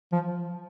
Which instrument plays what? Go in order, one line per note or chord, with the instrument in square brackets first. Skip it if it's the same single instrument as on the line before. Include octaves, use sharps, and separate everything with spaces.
[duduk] F3